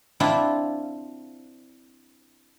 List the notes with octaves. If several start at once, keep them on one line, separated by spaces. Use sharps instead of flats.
C4 D4 E4 F4